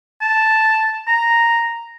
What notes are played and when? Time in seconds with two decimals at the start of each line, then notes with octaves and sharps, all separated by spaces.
0.21 A5
1.07 A#5